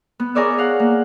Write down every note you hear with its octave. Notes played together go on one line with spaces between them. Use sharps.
B3
G#4 A#4 C#5 D5 E5
F5 F#5
A#3